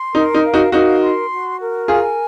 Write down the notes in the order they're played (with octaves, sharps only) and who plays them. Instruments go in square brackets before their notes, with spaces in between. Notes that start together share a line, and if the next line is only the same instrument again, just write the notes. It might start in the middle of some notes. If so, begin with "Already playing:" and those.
Already playing: [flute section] C6
[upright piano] D#4 [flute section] A#4
[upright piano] D#4
[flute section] F5
[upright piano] D#4 F#4
[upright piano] D#4 F#4 [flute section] A#4
[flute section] C6
F#4
A#4
[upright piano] F4 G#4 [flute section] G#5